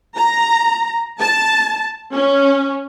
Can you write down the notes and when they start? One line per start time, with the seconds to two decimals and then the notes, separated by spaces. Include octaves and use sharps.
0.16 A#5
1.19 A5
2.14 C#4